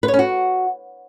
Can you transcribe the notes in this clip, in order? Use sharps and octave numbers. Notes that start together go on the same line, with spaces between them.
B4
C#5
C#4
F#4